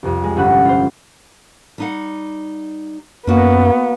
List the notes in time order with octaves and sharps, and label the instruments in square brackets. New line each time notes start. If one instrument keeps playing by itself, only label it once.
[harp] C2 F2
G#3
G1 C#4 F#5 B5 F#6
F4 C5
[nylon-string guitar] G3 D#4 F#5
[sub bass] F#2 [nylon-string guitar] A#3 F#4 [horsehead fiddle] B3